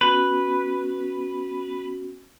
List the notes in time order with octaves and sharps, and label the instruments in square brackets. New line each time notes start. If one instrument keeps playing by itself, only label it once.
[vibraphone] B3 C#4 F#4 [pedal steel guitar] B4